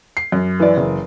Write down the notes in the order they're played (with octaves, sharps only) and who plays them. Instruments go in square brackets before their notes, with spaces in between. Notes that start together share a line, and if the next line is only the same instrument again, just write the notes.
[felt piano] C7
F#2
[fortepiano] E3 D5
[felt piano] F#1